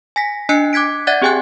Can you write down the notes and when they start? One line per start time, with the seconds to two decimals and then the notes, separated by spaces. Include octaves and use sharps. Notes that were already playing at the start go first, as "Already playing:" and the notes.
0.16 G#5 A#6 B6
0.49 D4 D#5 G#5 F#6 C7 C#7
0.73 D6 F#6 G#6 B6 D7
1.07 D5 E5 F#5 F#6 G#6 A6
1.22 C4 G4 G#4 G5 G#5 F#6